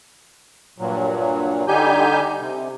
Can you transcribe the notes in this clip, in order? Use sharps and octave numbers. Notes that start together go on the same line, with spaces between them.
G2 A#2 F#3
D3 G3 D#4 G4 G#5 G6
C3